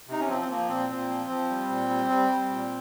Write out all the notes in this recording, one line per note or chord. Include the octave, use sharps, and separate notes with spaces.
C3 D#4
C#4
F3 C4
C4
F3 A#3
A#2 C4
A#2 C4
F3
F3
G3
A#2
G3
G3
G3
A#2